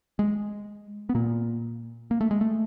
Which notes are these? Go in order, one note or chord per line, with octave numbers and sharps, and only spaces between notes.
G#3
B3
A#2 A#3
A#3
A3
G#3
A3